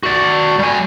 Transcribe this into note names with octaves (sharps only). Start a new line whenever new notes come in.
F#4 D5
G3 G#5